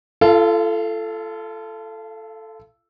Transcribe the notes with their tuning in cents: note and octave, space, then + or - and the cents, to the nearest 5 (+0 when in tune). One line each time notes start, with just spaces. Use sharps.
F4 -40 A4 +0 F5 +0